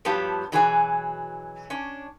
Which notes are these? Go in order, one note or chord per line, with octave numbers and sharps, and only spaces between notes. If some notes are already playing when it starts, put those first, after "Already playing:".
G2 F3 F#3 B3 G4 A5
B2 E3 F#3 G#4 A4 G#5
C#4 D4